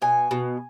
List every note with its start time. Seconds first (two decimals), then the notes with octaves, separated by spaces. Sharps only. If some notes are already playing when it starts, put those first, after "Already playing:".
0.02 B2 G#5
0.31 B2